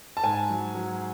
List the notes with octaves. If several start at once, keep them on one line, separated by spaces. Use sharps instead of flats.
A5
G#2 G#5
F#3
F#3